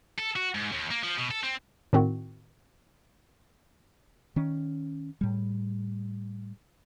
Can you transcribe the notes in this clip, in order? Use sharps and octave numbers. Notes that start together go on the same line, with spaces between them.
A4
F#4
G#2
D#2
A#3
F3
B2
A4
C4
A2 D#3 C4 F#4
D#3 C#4
A2 G3